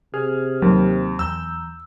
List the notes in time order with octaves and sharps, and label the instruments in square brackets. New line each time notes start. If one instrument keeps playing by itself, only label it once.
[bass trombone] C3 [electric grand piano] G#4 [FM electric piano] F6
[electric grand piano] D#2 [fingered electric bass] F#3
[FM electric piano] E2 A#5 G6 [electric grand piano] E6